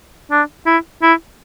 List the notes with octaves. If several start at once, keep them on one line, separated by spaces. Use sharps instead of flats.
D4
E4
E4